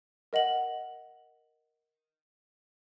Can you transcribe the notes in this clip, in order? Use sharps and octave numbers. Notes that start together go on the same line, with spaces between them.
A#4 D#5 F#5 F#7